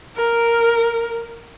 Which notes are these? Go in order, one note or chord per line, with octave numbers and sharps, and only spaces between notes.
A#4